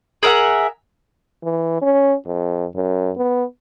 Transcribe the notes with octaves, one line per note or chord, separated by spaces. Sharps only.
G#4 A#4 E5 F#5
E3
C#4
F2
F#2
B3